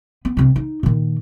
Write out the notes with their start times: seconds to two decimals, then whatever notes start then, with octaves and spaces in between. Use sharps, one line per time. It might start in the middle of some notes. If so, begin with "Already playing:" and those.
0.25 B3
0.37 C2 C3
0.56 D#4
0.83 A#2 D#3